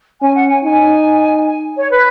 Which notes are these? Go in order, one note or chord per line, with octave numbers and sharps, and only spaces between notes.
C#4 G#5
F#5
G#5
D#4 G#5
G#5
C#5
B4